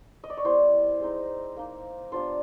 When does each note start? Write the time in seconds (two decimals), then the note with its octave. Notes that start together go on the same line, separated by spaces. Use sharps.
0.24 D#5
0.30 D5
0.37 C#5
0.44 G3 B3 E4 C5
1.00 G#3 C4 D#4
1.57 A#3 D#4
2.12 G3 B3 D4 F4 C5